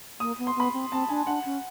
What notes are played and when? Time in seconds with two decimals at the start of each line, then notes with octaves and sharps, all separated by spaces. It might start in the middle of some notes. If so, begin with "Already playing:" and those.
0.20 A#3 D#6
0.39 B3
0.47 C6
0.56 B3 B5
0.73 C4
0.92 C4 A5
1.09 D4 G#5
1.27 D4 F#5
1.45 C#4